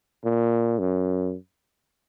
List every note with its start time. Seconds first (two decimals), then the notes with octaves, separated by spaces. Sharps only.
0.25 A#2
0.79 F#2